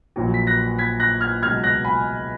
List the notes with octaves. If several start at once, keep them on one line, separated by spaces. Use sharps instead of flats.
A#1 A#2 F#3
B6
F#6 A#6
G#6 B6
F#6 A#6
F6 G#6
C#2 B2 F#3 F6 G#6
F#6 A#6
G#5 B5